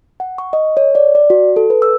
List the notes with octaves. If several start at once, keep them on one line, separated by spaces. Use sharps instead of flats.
F#5
C#6
D#5
C#5
D5
D5
F#4
A4
B4
E6